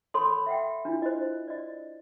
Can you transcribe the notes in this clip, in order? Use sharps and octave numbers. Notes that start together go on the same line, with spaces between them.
A4 C#5 B5 C6 D6
E5 F#5 G5
D4 E4 F4
C5 D#5
D5 D#5